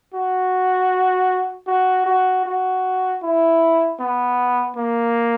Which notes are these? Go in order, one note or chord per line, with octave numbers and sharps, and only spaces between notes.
F#4
F#4
F#4
F#4
E4
B3
A#3